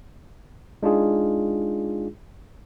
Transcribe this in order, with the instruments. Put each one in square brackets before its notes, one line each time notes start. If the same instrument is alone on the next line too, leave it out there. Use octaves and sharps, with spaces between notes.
[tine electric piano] G#3 D4 D#4 F4 G#4